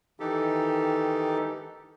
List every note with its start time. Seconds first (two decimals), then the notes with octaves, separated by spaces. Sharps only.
0.20 D#3 E3 D#4 G4 A4